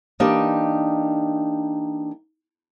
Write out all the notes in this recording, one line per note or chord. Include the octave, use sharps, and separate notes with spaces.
E3 A#3 D4 D#4 G4